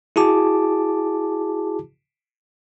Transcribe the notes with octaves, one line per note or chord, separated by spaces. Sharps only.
E4 F#4 G#4 A5 D6